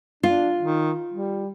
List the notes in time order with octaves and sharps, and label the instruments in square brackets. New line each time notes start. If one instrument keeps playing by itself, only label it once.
[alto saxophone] D4 [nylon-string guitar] F4
[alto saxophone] D#3
G3